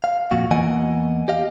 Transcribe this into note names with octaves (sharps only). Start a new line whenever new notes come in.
F5
F2 A#2 F#4
E2 E3 A#3 D#5 F#5 G#5
G4 D#5 F5